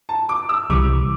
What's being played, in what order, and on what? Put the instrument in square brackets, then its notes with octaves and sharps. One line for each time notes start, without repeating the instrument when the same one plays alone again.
[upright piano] A5
D6
E6
[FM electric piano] C2 C3 E3 G3 [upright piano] D6